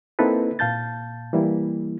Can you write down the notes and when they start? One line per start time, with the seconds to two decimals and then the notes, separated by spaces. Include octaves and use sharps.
0.19 A#3 C4 D#4 E4 A4 B4
0.59 A#2 F5 A5 G6 A6
1.33 E3 G3 A#3 E4